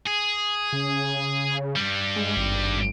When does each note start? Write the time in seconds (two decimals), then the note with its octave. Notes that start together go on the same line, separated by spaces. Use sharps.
0.06 G#4
0.73 C#3
1.76 G2 G3
2.16 G#3
2.37 G#1